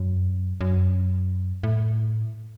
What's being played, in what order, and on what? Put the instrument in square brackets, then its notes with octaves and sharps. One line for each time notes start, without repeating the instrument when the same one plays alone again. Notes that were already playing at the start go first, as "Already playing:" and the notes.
Already playing: [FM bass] F#2
F#2
A2